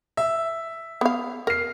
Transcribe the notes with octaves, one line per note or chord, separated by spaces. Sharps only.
E5
B3 F5
A#4 F6 C7